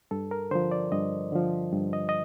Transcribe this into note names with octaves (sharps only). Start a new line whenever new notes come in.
G2 A4
A#4
D3 F3 C5
D5
G2 D#5
D3 F3
G2
D#5
D#5